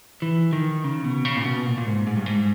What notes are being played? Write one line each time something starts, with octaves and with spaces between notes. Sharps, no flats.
E3
D#3
C#3
B2
C#3
A#2
B2
A#2
A#2
G#2
G#2
G2
G#2